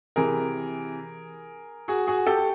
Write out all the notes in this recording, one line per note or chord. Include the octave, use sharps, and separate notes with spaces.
C3 E3 G#4 A#4
F#4 G#4
F#4 G#4
G4 A4